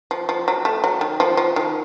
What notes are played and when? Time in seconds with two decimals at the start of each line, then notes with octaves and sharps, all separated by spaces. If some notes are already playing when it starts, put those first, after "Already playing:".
0.11 F3
0.29 F3
0.48 F#3
0.65 A3
0.84 F#3
1.01 D#3
1.20 F3
1.37 F3
1.56 D#3